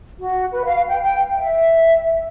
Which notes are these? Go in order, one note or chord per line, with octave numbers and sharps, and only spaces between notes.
F#4
B4
F5
G5
G5
E5